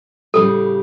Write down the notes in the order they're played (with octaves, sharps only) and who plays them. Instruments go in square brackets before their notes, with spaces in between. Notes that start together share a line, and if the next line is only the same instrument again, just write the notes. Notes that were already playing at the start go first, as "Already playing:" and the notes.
[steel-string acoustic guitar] A2 C#3 G3 [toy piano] A4